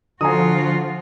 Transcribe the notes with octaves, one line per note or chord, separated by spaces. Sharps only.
D3 F3 F4 F#4 G#5 A#5 D#6